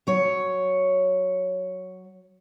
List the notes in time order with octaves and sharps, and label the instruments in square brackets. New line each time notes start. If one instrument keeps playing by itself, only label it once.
[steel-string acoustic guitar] F#3 C#5